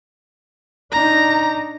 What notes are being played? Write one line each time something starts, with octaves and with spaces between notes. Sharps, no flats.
D4 D#4 A#5